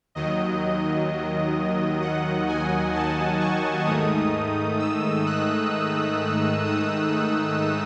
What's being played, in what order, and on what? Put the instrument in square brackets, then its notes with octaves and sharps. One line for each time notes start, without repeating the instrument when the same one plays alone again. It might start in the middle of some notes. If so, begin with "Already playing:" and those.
[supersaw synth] D#2 D#3 F#3 D#5
F#5
G#5
A5
C#6
G#2 D#3 A3 D#4 D#6
E6
F#6
D#6